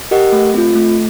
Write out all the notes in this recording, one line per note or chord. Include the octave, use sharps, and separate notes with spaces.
G4 A#4 D#5 F#5
A3
C4 F4
A3